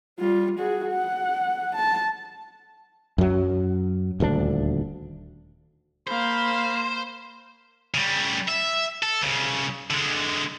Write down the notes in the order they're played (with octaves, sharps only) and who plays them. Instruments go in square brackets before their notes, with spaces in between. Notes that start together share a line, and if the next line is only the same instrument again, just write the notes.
[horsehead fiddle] G3 F4
F#4 G#4
F#5
A5
[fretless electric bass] F#2 F#3
D#1 D2 G#3 D4
[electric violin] A#3 F5 [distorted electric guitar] C5 [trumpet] B5
[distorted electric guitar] C#3 G3
E5
A4
C2 C#3
D3 G#3